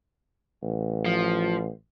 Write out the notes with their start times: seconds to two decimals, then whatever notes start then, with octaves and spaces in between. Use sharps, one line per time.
0.63 A1
1.05 F3